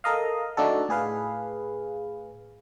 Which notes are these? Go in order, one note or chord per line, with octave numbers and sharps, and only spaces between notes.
A4 A#4 D#5 F5
A3 D4 D#4 F#4 A4
A2 G#4 B4 F5